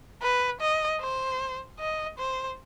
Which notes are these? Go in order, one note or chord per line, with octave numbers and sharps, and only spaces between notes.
B4
D#5
C5
D#5
C5